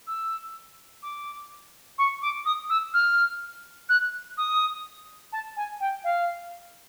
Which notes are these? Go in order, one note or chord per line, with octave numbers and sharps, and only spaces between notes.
E6
D6
C#6
D6
D#6
E6
F6
F#6
D#6
A5
G#5
G5
F5